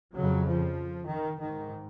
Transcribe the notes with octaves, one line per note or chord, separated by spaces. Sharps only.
F2 C#3 F#3
F3
D#3
G#2 D#3